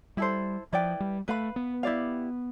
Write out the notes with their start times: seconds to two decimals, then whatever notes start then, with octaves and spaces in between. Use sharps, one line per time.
0.17 G3 E4 A4 C5
0.73 F3 E4 B4 D5 G5
1.00 G3
1.28 A3 B4 F5 B5
1.56 B3
1.83 E4 G4 D5 F5